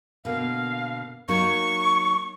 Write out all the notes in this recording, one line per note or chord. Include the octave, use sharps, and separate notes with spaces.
B2 D3 A#3 F5
F#3 A#3 D#4 C#6